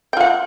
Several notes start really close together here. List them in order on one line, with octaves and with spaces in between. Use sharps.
G5 F4 F#5